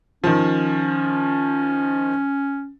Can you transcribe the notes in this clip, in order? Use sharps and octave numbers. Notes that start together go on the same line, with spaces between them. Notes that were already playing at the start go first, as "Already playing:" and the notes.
D#3 F3 C#4